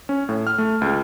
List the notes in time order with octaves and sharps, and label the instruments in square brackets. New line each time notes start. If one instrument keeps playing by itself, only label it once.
[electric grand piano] C#4
A2
F6
A3
C#2